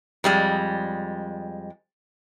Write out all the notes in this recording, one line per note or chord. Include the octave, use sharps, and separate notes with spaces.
F2 G3 G#3